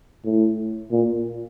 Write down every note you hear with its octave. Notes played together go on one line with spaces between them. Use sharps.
A2
A#2